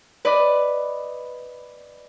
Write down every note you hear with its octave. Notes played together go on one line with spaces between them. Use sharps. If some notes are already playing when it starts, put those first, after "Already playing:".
B4 D5 D#5